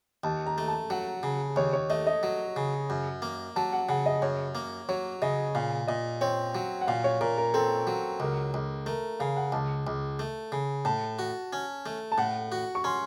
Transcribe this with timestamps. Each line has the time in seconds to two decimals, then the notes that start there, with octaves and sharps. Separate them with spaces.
0.24 D#2 A5
0.46 A#5
0.58 A3
0.68 A5
0.90 F#3 F#5
1.23 C#3
1.56 D#2 C#5
1.73 C#5
1.90 A3 D#5
2.07 D#5
2.23 F#3
2.56 C#3
2.90 F#2
3.22 A#3
3.56 F#3 A5
3.73 F#5
3.89 C#3 F#5
4.06 D#5
4.22 F#2 C#5
4.55 A#3
4.89 F#3 C#5
5.22 C#3 D#5
5.55 A#2 F5
5.87 A#2 D#5
6.21 C4 C#5
6.55 F#3
6.81 F#5
6.88 A#2 F5
7.04 C#5
7.21 A#2 A#4
7.37 A#4
7.54 C4 A4
7.87 F#3
8.20 C#2 A#4
8.54 C#2
8.86 A3 A#4
9.20 C#3 F5
9.37 F#5
9.52 C#2 A5
9.87 C#2
10.19 A3
10.52 C#3
10.85 A2 A5
11.19 F#4
11.53 C#4
11.86 A3
12.12 A5
12.18 A2 F#5
12.52 F#4
12.75 C#6
12.84 C#4 C6